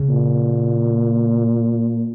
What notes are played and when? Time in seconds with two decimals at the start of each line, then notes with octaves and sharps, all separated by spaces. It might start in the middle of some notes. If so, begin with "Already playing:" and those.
Already playing: C#3
0.09 A#2